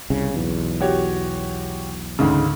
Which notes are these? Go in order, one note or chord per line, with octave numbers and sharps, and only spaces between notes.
C2 C#3
B1 E2
F#4 G4 C#5
D2 G#2 C#3